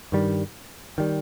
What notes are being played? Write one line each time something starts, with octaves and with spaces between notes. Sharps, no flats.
G2 D#3 G3
D#3 G3